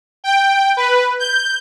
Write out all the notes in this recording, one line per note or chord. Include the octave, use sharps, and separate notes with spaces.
G5
B4
G6